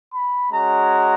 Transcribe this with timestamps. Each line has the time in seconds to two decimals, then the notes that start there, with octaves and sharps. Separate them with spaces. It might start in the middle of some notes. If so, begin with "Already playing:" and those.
0.13 B5
0.52 G#3 C#4 F#4 A#5